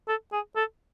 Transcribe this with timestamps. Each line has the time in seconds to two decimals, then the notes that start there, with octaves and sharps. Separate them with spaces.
0.08 A4
0.33 G#4
0.56 A4